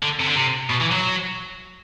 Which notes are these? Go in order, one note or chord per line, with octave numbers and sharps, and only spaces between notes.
D3
C3
D3
C3
B2
E3
F#3